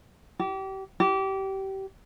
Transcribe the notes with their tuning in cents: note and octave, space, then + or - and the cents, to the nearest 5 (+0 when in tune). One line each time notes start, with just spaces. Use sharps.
G4 -30
G4 -25